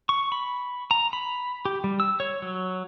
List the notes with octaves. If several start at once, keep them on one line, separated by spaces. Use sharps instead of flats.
C#6
B5
A#5
B5
G4
G3
E6
C#5
F#3